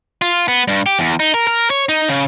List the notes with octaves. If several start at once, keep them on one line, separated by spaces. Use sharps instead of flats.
F4
B3
G2
G4
E2
D#4
A#4
A#4
C#5
D#4
C#3